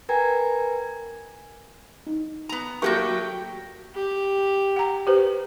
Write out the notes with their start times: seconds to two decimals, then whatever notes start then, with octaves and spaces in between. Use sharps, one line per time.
0.09 A#4 B4 G5 G#5 A#5 G#6
2.07 D#4
2.49 B3 A#5
2.82 F#3 A3 A#3 F#4 G4 A#4 G5 C#6
3.95 G4
4.76 F#5 A#5
5.07 G4 B4 C5